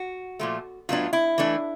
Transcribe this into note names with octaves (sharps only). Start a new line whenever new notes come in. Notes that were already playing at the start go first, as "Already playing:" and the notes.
Already playing: F#4
A#2 F3 A3
A2 F#3 B3 D4 F4
E4
E3 A3 D4